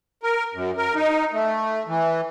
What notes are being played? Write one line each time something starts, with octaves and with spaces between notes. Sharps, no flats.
A#4
F#2
A#4
D#4
A3
E3